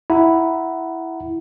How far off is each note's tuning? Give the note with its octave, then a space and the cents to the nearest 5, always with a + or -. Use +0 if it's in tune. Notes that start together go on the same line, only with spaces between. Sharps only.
E4 +0 F#5 +5 A#5 +0